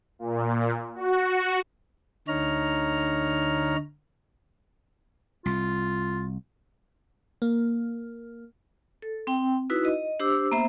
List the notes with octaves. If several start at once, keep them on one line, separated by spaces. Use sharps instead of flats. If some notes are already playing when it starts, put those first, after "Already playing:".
A#2
F#4
D2 D3 D#4 C#5 A#5 F6
C2 F4
A#3
A4
C4 G5
D#4 E4 F#4 B4
D#5
D4 G4 C5 D6 E6
A#3 B3 C5 E5